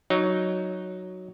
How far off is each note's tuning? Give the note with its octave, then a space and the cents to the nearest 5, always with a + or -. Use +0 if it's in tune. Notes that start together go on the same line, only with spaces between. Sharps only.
F#3 +0 D#4 +0 C#5 +20